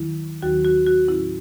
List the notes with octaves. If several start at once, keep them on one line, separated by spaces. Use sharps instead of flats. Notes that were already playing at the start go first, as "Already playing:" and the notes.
Already playing: D#2 D#3 F#3 E4
D#2 D#3 F#3 F#4
F#4
F#4
A2 F#3 C#4 E4